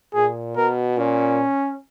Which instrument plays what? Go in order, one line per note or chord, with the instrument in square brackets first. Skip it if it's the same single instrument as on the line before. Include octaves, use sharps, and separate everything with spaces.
[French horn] A#2 [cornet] G#4
[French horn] B2 [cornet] A#4
[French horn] A#2 [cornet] C#4